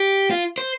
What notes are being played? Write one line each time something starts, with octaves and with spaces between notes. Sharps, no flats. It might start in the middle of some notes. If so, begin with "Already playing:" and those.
Already playing: G4
F4
C5